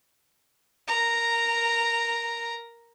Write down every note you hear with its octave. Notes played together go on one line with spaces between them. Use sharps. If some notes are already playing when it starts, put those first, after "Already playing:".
A#4 A#5